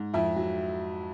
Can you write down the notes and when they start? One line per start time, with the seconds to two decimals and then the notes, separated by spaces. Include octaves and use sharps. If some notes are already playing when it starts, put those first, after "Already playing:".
Already playing: G#2
0.13 F2 E4 E5
0.36 F#3